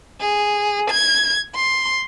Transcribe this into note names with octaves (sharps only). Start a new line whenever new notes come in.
G#4
G#6
C6